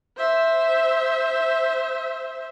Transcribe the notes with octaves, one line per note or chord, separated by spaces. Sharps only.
C5 E5